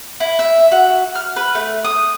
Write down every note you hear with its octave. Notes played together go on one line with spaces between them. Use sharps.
E4
E5
F#4
F6
B4
A3
D#6